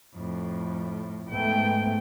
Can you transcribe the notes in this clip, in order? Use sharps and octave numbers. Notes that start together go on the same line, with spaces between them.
F2 A2
G#2 A3 B3 G5